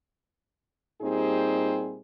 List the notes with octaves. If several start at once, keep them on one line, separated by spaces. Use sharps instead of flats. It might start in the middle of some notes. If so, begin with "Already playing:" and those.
A#2 G3 C4 D#4 G4 G#4